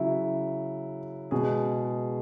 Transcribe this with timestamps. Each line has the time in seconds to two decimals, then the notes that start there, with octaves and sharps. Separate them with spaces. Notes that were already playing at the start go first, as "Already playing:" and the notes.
Already playing: C#3 F#3 E4
1.31 B2 G#3 G#4